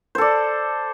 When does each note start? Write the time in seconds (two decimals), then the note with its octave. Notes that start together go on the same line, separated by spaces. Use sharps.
0.15 C5
0.18 A4
0.21 D5